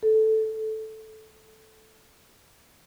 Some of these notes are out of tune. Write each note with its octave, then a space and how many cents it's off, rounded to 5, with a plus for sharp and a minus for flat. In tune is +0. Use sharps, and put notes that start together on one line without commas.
A4 -5